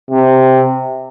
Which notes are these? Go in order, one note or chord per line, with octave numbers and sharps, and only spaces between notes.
C3